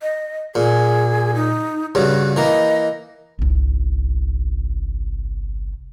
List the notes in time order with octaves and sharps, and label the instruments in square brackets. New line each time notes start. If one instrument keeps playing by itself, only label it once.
[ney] D#5
[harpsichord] A#2 [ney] G#4
[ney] D#4
[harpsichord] G2 C#3 [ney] F#4
[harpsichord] E3 A#3 [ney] D#5
[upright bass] G1 C2